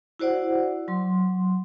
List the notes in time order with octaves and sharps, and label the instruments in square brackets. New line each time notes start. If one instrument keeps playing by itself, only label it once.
[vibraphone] E4 F#4 C5 D5 F#5
F#3 C6